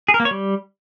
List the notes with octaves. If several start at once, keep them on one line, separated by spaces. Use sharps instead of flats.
G#4
A#4
A#3
C#5
G3